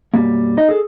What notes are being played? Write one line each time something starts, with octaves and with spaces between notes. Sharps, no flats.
B1 F#2 G3 A#3
D#4 D#5
G#4 A4